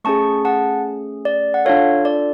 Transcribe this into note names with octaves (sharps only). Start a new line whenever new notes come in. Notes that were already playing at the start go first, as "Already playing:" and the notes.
A3 C#4 G#4 A5 C#6
F#5 A5
D5
F#5
D4 F4 A4 C#5 F5
D5